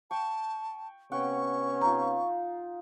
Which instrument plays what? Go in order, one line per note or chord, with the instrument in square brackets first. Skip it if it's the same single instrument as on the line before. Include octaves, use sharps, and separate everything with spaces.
[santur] G5 C#6 [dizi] A5
[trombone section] C3 B3 C#4 [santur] F#5 G5 [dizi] C#6
[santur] D#4 F4 [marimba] A#5